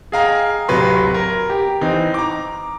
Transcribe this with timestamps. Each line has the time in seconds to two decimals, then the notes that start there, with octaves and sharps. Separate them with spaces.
0.12 G#4 D#5 F5 G5 A#5
0.68 D1 C3 F#3 B4 C6
1.14 A#4
1.50 G4
1.81 E3 C4 D#4
2.14 A#5 D6